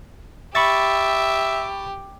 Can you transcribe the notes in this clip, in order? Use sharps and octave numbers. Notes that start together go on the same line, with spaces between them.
G4 E5 B5 C#6 A6